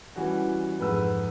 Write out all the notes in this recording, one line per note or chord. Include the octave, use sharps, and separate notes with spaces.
E3 G3 C#4 F#4
F2 G#2 B4 F#5 E6